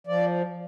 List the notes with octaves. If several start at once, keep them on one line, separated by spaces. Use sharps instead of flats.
F3 D5